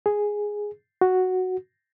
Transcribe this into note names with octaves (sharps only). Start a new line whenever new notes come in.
G#4
F#4